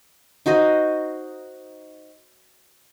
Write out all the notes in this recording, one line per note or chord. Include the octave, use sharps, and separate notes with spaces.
D#4 F#4 C5 D#5